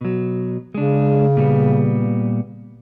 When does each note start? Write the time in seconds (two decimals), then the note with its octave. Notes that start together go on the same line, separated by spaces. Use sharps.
0.01 B2 F#3
0.75 C#3 G#3 D4
1.37 A#2 G3 B3